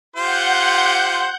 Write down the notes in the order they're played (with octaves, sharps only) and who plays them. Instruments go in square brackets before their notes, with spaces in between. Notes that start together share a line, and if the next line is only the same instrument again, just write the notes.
[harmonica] F4 G4 C5 [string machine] F#5 G6